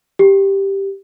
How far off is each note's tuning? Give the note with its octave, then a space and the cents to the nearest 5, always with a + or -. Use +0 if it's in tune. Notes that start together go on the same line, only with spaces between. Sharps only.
G4 +0